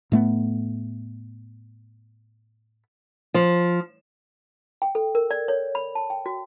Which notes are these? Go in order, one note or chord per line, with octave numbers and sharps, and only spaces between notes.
A2 A3 B3
F3
G5
A4
A#4
D5
C#5
B5
A5
G5
F#4